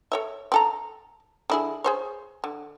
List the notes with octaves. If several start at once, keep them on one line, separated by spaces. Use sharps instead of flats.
A4 C#5 E5
C4 A4 A#5
D3 E4 G#4
G#4 C5 C#5
D3